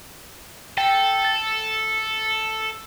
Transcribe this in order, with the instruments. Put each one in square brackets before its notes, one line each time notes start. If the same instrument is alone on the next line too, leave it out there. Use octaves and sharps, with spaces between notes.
[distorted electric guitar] A4 [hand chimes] G5
[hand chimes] A6